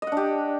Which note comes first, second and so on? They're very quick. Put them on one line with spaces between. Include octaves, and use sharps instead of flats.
D#5 F#5 D4 G4